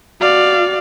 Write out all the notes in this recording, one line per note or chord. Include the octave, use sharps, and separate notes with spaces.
F#4 D5 F5